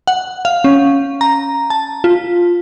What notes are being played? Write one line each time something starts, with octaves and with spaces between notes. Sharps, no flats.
F#5
F5
C#4
A#5
A5
F4